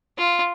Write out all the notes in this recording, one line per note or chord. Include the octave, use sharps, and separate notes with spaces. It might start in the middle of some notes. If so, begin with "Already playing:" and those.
F4